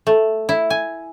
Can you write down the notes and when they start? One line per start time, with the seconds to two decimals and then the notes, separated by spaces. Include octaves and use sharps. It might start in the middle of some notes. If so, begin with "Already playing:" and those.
0.07 A3
0.49 E4
0.70 G#5